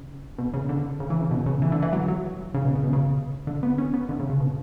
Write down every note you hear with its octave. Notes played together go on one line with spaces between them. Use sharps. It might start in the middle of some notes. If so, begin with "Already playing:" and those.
Already playing: C#3
B2
C#3
D3
C#3
E3
C#3
B2
C#3
E3
D3
E3
F#3
F#3
C#3
B2
C#3
B2
C#3
D3
B3
C#4
B3
D3
C#3
C#3
B2